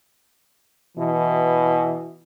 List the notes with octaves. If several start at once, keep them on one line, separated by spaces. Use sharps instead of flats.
B2 E3